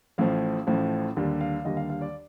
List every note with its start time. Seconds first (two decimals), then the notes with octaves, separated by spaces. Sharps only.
0.18 A1 A2 F3 F5
0.67 A1 A2 F3
1.17 D#2 D3 G3
1.41 F5
1.65 D#2 D3 G3 D#5
1.77 F5
1.90 F5
2.01 D5